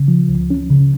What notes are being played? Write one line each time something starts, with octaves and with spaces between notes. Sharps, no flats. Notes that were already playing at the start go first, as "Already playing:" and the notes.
Already playing: C#3
F3
C#2
C#4
C#3